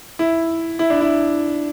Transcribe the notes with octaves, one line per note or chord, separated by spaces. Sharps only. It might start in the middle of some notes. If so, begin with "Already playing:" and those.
E4
E4
D4
E4